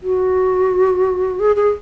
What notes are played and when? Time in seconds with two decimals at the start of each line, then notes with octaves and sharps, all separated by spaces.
0.03 F#4
1.40 G#4
1.56 G#4